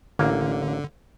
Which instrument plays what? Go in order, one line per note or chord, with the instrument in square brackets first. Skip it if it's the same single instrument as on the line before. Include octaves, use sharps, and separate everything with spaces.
[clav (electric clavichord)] A1 A#3 [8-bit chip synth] D3